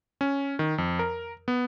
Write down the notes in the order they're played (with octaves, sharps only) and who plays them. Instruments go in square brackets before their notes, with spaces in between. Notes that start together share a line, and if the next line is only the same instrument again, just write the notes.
[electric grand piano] C#4
D#3
F2
A#4
B3